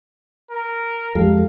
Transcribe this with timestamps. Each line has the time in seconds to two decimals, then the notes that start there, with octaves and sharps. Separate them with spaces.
0.50 A#4
1.15 F2 G#3 G4 A4 F5